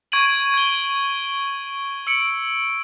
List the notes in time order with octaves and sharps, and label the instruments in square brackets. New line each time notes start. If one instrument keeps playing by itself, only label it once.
[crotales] C#6 G#6 D7 D#7 F#7
G#6 G7
E6 C#7 D7